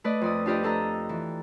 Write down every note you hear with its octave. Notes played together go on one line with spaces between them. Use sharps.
A3 B4 D5 D#5
F2 D5 D#6
D4 F4 G4 B4 D5 D#5
D4 A4 D#5 A#5
E3